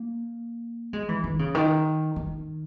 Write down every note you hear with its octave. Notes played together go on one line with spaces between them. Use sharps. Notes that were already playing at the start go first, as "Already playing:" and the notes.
Already playing: A#3
G#3
E3
D#3
C#3
D#3
D#3